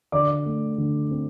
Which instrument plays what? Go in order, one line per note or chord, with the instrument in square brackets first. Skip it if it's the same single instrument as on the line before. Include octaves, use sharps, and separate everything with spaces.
[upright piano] D3 D5 D6
A3
D3
C4